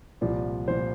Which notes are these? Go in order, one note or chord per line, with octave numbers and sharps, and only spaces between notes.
C2 A#2 F3 D5
A#2 F3 C5